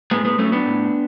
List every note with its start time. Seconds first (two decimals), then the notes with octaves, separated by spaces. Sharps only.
0.11 A2 G#3 B3
0.25 G#3 B3
0.38 F#3 A3 C#4
0.52 B3 D4
0.66 A2